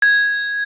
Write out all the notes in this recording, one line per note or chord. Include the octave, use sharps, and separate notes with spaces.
G#6